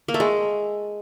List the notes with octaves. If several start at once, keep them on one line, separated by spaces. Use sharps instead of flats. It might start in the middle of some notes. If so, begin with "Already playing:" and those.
A#3
A3
G#3